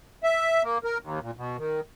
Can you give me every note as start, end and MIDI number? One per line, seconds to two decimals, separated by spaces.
0.24 0.63 76
0.63 0.78 58
0.84 0.98 70
1.01 1.19 39
1.22 1.31 46
1.37 1.57 47
1.57 1.81 51